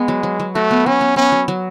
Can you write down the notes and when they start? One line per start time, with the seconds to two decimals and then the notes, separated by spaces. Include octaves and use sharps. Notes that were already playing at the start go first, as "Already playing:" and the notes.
Already playing: G#3 B3
0.08 F#3
0.23 F#3
0.40 F#3
0.55 A3 F#4
0.71 B3
0.86 F#3 C#4
1.01 B3
1.16 B3 C#4
1.32 F#3
1.48 F#3